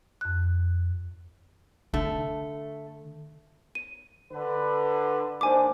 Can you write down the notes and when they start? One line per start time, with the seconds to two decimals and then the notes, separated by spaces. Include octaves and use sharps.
0.21 F2 F#6
1.94 D3 A3
3.75 D#7
4.32 D3 B4
5.41 D#2 G#2 D4 C5 G#5 D6